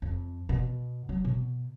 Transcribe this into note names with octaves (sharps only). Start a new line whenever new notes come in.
F2
B2
F#3
B2